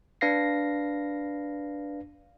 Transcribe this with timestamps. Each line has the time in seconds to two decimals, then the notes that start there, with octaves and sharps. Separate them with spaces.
0.21 D4 B4 F5 A#6 C7